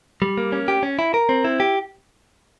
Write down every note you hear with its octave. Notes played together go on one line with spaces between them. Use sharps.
G3
A#3
C#4
G4
C#4
E4
A#4
C4
E4
G4